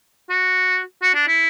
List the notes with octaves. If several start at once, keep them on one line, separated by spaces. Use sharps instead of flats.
F#4
F#4
D4
E4